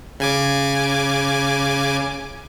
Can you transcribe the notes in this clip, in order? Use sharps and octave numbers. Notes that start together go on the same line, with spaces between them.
C#3 G#5 D6